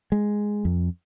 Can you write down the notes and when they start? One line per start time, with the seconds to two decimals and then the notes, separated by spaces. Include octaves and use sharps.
0.12 G#3
0.65 F2